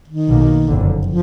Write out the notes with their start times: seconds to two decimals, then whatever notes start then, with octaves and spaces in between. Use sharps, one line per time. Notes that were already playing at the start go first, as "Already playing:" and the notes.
0.08 D#3
0.27 B1 B2 A#3
0.67 F#1 F2 D3
1.07 F3